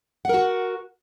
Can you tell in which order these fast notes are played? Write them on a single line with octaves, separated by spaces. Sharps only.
F#5 A#4 F#4